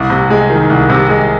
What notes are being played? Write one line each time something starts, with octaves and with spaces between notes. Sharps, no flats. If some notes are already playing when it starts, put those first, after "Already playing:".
Already playing: C2
C3
G#3
D#3
C2
C3
G#3